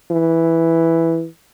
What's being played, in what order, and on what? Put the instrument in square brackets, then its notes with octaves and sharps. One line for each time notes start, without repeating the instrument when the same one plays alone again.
[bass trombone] E3